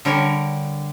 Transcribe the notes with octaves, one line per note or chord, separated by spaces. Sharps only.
D3 G3 A#4 C#5